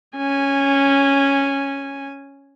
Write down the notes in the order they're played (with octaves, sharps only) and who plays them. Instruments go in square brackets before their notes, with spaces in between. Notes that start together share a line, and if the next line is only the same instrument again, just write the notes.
[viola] C#4 G#5